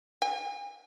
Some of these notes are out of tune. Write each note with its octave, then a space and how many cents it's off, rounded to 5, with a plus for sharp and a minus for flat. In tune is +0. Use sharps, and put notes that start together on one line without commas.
G#5 -45